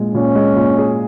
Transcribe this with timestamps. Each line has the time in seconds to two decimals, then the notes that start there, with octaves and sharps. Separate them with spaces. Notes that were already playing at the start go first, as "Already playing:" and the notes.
Already playing: A#2 G#3
0.14 A#2 C#4
0.35 G#3
0.56 A#2
0.78 G#4